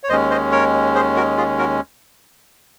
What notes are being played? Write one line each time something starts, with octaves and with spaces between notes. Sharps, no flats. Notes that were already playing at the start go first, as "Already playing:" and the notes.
C#5
D#2 D#3 G#3 C#4 C5 D#5
C5 D#5
A#4 C#5
G#4 C5
F#4 A#4
F4 G#4
F#4 A#4